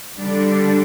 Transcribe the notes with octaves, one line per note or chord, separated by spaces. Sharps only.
D3 G3 D4